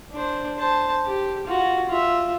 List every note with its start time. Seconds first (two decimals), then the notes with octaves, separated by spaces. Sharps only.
0.12 D4 C5
0.58 C5 A5
1.06 G4
1.47 F4 F#4
1.88 F4 E5